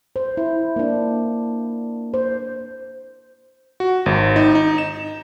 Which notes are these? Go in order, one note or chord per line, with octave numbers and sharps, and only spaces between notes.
C5
E4
A#3 D4
C5
F#4
G#1
D#4
D#4
E7